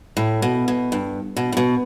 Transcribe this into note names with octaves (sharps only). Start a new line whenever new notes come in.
A2
B2
B2
G2
B2
A2
B2